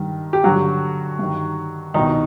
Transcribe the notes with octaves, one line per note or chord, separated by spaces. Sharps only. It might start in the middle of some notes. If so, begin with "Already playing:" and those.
Already playing: G2 D#3
G4
G2 D3 F#3 F#4
G2 D#3
C2 B2 D#3 D#4